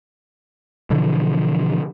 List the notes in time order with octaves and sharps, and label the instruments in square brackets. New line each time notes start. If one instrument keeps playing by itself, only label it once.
[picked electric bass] B2 D3 E3 F3